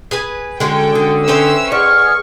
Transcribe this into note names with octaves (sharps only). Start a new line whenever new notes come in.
G#4 B4 G#5
D3 G#3 C#4 F#4 A4 G5
D3 D#6
C#4 B4 C5 E5 G5 E6
G#4 D5 F#5 C#6 F6